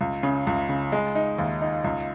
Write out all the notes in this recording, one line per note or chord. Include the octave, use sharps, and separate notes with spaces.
C#2
C#3
C#2
C#3
G#3
D#4
D#2
D#4
C#2